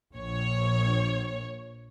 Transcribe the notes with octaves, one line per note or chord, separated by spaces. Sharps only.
A#1 C#5